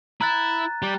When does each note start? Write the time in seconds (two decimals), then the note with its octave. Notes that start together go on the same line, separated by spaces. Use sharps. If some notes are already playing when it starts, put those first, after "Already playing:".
0.21 E4 A#5 F#6 A6
0.82 G3 G4